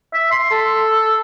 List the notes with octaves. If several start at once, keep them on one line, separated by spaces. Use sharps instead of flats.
E5
C6
A4